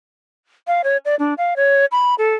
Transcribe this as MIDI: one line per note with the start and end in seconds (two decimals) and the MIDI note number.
0.67 0.81 77
0.84 0.97 73
1.05 1.15 74
1.19 1.34 62
1.38 1.54 77
1.56 1.85 73
1.91 2.15 83
2.18 2.35 69